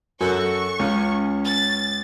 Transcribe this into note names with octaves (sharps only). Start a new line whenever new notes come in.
F#2 F#4 A4 C#6
C#2 C#4
A6